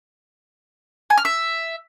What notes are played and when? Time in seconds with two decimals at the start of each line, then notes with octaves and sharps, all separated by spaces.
1.10 G#5
1.18 F6
1.25 E5